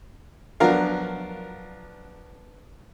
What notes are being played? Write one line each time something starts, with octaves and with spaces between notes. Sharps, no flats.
F3 F#3 B3 D4 A#4 F5